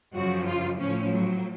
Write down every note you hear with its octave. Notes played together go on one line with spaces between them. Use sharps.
F#2 C#3 F3 F#4
F4
A2 F3 C#4
F#3